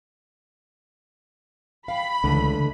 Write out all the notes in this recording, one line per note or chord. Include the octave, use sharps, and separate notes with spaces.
F5 G5 B5
C#2 D3 E3 A3